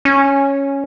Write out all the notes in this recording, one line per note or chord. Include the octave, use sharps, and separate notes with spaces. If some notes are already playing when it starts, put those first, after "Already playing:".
C#4